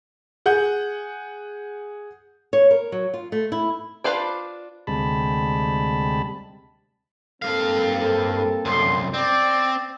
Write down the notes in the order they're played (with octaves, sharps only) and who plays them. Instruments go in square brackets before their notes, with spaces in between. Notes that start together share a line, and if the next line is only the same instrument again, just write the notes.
[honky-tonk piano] G#4 F#5 G6
[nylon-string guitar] C#5
A#4
F#3
F4
A3
E4
[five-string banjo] D4 F4 B4 C5 D5
[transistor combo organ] D2 C3 G3 G#3 A5 B5
[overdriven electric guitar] G2 F5 [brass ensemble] A#3 C4 A4
[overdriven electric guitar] C2 F#2 [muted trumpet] C6
[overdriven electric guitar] C4 [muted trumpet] D5